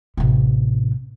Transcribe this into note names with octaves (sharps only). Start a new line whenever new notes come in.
A1 C3